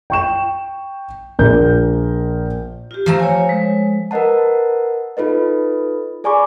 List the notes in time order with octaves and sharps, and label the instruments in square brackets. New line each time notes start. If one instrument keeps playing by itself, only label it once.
[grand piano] G5 C#6 E7
A#1 A#4 G6
[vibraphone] F4 G4
[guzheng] F3 A3 A#5
[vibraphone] C#5 G#5
G#3
[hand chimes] A#4 B4 D#5 F#5 A5
D#4 F4 A4 B4 D#5
G#4 D5 G#5 B5 C#6 D6